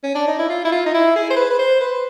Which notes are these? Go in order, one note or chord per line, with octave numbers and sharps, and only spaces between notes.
C#4
D4
D#4
E4
F4
E4
F4
D#4
E4
G#4
C5
B4
B4
C5
B4